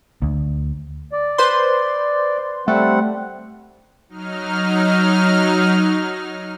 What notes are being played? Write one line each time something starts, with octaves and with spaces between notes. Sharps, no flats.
D2
D5
B4 C5 C6
G3 A3 C4 F#5
F#3 D#4 F6